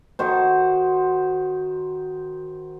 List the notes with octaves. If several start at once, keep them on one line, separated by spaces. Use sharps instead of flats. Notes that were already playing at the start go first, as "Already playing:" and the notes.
D#3 F#4 C5